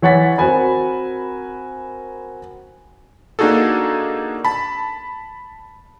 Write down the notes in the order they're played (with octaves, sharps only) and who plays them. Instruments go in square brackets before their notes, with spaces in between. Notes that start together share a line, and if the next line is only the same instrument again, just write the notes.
[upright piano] E3 C#5 F#5 A6 B6
C4 F#4 A#4 G#5 B5
[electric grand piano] A#3 D4 D#4 F#4 G#4 A4
A5 B5